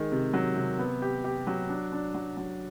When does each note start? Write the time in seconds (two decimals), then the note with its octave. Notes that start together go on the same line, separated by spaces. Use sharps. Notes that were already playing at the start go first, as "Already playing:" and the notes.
Already playing: D#3 G#3
0.11 C3
0.33 F#3
0.56 C3
0.79 B3
1.02 G4
1.24 G4
1.47 F#3
1.69 D4
1.92 D4
2.14 F#3
2.37 F#3